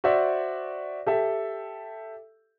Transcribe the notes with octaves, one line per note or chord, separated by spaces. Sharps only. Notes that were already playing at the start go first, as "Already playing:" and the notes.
F#4 C5 D5 E5
G4 A4 E5